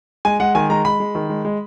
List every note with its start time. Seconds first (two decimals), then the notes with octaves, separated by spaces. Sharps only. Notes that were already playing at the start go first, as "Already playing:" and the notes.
0.25 G#3 G#5
0.40 G#3 F#5
0.55 D#3 G#5
0.70 G#3 A#5
0.85 G#3 B5
1.00 G#3
1.15 D#3
1.30 G#3
1.45 G#3